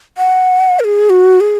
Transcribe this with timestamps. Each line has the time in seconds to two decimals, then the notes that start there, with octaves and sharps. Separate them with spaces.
0.18 F#5
0.80 A#4
0.84 G#4
1.10 F#4
1.40 G#4